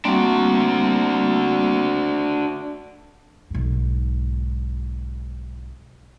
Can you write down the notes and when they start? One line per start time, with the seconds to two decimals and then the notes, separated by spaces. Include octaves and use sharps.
0.05 G3 A#3 C4 D4 F#4
3.50 B1 G#2